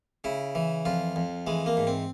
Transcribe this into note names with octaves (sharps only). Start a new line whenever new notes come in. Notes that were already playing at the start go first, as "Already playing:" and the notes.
C#3 E4
E3
F2 F4
F2
E3 G#3
A#3
G#2
C4